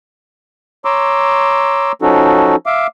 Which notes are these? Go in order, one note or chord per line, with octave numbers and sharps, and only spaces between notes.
C#5 A#5 C6 D6 E6
F3 C#4 D#4 F#4 A4
E5 F5 D6